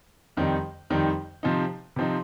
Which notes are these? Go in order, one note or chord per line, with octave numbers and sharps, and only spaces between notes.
F2 D#3 G3 C4 D#4
F2 D#3 G3 C4 D#4
C3 F3 C4 D#4
C3 F3 C4 D#4